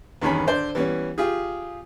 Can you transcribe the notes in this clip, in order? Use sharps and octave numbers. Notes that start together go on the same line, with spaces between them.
E2 G2 D#3 C#4 G#5 B5
D3 C5 D5
E3 G3 B3 C#4
F4 G4 G#4